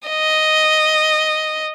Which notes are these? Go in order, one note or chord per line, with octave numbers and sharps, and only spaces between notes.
D#5